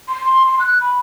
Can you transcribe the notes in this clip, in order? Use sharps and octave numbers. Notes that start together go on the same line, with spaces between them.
C6
C6
F#6
B5